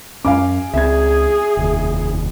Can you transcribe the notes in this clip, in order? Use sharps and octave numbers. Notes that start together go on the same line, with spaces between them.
F#2 C#4 F5 G#5 D6
C#2 C4 G#4 E5 G#6
F1 D#2